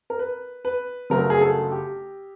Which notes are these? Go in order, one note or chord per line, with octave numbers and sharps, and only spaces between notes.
A#4
B4
B4
G1 F#2 C#3 F#3 A3 A#4
G#4
A4
G4